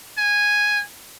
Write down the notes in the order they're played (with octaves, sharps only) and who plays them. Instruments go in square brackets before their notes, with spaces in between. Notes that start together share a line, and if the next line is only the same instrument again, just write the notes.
[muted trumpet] G#5